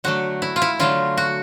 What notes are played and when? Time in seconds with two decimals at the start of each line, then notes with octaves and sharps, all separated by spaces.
0.04 D3 F#3 A3 F#4
0.42 E4
0.56 F4
0.62 E4
0.79 D3 F#3 A3 F4
1.17 F#4